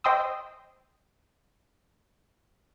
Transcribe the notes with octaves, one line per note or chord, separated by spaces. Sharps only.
C5 D#5 G5 C6 D#6 E6